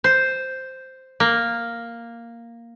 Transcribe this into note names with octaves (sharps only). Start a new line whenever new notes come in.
C5
A#3